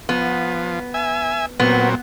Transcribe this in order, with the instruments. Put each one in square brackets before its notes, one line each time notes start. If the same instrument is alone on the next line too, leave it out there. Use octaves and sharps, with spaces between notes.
[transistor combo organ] F3 [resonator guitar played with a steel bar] B3
[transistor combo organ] E5 G#5
[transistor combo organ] A#2 F#3 C4 [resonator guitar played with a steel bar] B3